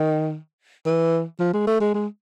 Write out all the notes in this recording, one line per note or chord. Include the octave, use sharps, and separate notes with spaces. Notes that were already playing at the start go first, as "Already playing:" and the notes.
Already playing: D#3
E3
F3
G#3
A3
G#3
G#3